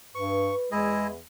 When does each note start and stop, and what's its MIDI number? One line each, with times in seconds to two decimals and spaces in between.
0.15 0.51 43
0.15 0.67 71
0.15 0.55 85
0.72 1.15 40
0.72 1.07 56
0.72 1.07 64
0.72 1.07 68
0.72 1.07 75